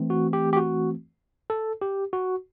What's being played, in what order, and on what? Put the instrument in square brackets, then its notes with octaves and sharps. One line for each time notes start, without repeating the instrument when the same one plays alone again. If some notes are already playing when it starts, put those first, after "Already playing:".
Already playing: [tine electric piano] E3 A3 C4
F#4
G4
G4
F#4
A4
G4
F#4